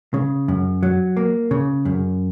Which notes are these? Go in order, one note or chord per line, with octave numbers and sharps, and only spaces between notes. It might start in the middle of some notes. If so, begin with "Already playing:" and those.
C#3
F#2
F#3
A#3
C#3
F#2